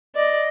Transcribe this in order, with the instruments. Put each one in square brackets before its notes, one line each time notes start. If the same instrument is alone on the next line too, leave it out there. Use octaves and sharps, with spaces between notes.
[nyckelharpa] D5 [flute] D#5